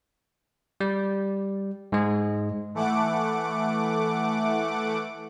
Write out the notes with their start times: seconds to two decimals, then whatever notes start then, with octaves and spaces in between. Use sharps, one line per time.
0.81 G3
1.92 G#2 G#3
2.74 E3 A3 F#5 D6